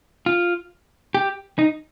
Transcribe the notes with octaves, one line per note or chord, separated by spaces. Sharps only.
F4
G4
D#4